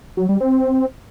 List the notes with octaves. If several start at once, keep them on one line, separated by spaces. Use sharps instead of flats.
F#3
G3
C4